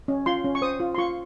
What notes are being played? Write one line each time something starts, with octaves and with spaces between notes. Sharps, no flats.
C#4
F4 C6
C#4
C#6
C5 D#6
F4
C6
F4 C#6